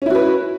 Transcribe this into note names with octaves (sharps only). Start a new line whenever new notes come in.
C#4 E4 F#4 B4